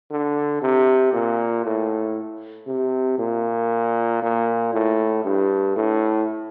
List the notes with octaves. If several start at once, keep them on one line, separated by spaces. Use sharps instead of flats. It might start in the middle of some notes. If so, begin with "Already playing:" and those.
D3
C3
A#2
A2
C3
A#2
A#2
A2
G2
A2